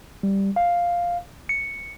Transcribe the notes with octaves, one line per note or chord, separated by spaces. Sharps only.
G3
F5
C#7